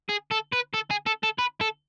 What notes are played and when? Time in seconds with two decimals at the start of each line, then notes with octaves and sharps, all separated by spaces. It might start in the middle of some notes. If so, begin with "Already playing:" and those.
0.09 G#4
0.31 A4
0.52 B4
0.74 A4
0.90 G#4
1.07 A4
1.24 A4
1.39 B4
1.61 A4